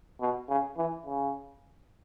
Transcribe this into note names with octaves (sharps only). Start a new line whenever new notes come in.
B2
C#3
E3
C#3